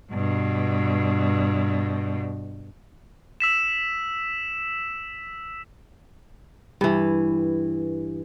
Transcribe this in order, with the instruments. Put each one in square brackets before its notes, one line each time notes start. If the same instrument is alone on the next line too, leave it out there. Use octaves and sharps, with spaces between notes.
[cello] G2 B2
[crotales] E6 B6 E7
[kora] G2 E3